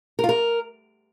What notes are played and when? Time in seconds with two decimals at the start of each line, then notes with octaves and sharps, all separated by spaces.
0.19 A#4
0.24 F4
0.29 A#4